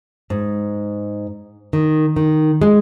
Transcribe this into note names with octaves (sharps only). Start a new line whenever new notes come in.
G#2
D#3
D#3
G#3